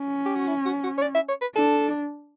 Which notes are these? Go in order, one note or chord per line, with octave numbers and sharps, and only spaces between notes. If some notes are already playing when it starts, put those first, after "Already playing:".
Already playing: C#4
G4
F#4
E4
F#4
F#4
C#5
D5
E5
C#5
B4
D4 A4